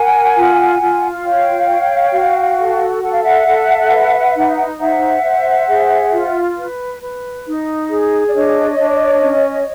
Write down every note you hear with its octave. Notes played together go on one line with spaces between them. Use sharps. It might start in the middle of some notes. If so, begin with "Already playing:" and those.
Already playing: A#4 F#5 G#5
F4
F4
C#5 F5 G5
C#5
F#4
A4
A4 F#5
F5
E5 F#5
A4
B4
D#4
C5 E5 F#5
C5
G#4
F4
B4
B4
D#4
G#4
D5
D4 C#5 D#5
D4
C#4